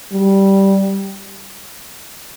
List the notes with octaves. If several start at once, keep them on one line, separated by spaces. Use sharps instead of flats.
G3